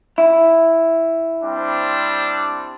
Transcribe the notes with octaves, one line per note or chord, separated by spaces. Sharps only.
E4
G3 C4 D4